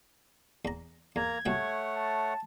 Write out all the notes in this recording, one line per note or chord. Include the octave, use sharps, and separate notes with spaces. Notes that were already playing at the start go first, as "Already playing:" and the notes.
E2 A#5
E2 A#3 A#5 G#6
C2 A3 F#4 C#5 F#5 G5
A5